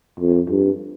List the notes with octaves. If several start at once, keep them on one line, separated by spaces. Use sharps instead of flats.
F2
G2